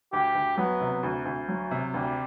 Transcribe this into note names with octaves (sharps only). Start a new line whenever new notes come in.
D2 G4
D2
F#3 B3
C3
D2
D2
F#3
C3
D2 G3